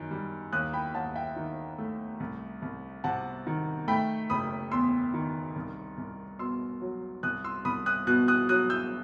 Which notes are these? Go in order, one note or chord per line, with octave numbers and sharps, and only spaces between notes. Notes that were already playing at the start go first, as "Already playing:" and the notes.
Already playing: F#2 D#3
G3
D#2 D#6 F#6
G5 B5
D#2 F#5 A5
E5 G5
D#3
A3
C2
C2
C3 F#5 A5
D#3
A3 G5 B5
F#1 B5 D#6
E2 C6 E6
D#3
C2
C2
B2 C6 E6
F#3
C2 D#6 F#6
C6 E6
C2 B5 D#6
D#6 F#6
B2 D#6 F#6
D#6 F#6
F#3 D#6 F#6
E6 G6